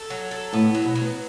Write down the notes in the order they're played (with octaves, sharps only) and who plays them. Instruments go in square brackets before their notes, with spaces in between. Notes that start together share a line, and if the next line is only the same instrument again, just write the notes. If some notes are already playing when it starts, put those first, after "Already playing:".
Already playing: [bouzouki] A4
F#3
A4
[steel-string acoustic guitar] A2 [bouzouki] B3
[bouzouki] F#3
[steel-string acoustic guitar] B2
[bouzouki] F#3
[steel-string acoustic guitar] B3